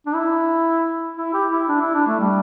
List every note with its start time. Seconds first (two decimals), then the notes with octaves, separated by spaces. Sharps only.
0.06 D4
0.14 E4
1.17 E4
1.33 G4
1.51 E4
1.68 D4
1.81 E4
1.94 D4
2.07 A3
2.19 G3